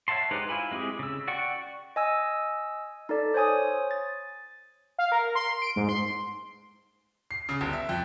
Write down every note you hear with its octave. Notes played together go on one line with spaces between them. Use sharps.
C#5 E5 F#5 A5 C6
G#3 D#4 G4 B4 C5
E4 F4 G#5 B5
G#3 C4 E4 G4 G#4
C#3 E6
F#4 D5 F#5 G5 C#6
D#5 G#5 E6
D#4 A4 D5
C5 C#5 G#5 D#6
A6
F5
A#4
C6
D7
G#2
C6
C7
C#3
G1
E5
F2